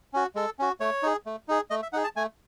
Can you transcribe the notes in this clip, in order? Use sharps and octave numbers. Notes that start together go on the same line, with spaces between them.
C#4 F#4
G#3 A4
C#4 F#4
A3 C#5
D#4 G#4
A3
D#4 G#4
A3 D#5
E5
D#4 G#4 F#5
A5
A3 G#5